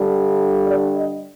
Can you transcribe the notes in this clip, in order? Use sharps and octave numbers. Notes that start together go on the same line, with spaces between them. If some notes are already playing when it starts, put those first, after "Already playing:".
Already playing: G2 D3 G3
D5
D#5